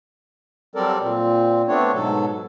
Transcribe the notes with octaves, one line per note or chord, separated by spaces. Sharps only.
F#3 G3 C4 A4 A#4 D5
A#2 C4
A3 B3 C4 D4 C#5
G#2 B2 F#3 A4